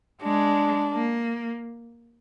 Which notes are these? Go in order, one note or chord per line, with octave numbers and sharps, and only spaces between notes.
G#3 D4
A#3